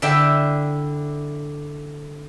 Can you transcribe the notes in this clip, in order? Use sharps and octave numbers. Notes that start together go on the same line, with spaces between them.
D3 E4 D5 E5 G5